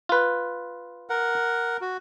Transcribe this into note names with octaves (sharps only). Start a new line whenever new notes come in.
F4 B4
A#4 F#5
F#4